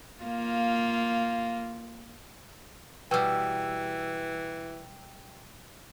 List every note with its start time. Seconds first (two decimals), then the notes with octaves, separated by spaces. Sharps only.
0.24 A#3 F4
3.11 B2 E3 G3 G5 E6